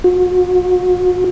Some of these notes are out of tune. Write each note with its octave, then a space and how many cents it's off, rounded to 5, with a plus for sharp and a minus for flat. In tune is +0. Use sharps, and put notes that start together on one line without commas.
F#4 -40